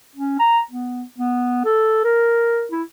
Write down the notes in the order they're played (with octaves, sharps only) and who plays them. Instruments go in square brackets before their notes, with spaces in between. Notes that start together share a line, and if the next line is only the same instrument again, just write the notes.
[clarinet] C#4
A#5
B3
B3
A4
A#4
E4